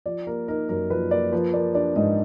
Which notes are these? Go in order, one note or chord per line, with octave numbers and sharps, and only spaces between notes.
F3 D5
A#3 A#4
D#4 A#4
F#2 A#4
F3 B4
A#3 D5
F3 B4
A#3 D5
D4 D5
G#2 D#5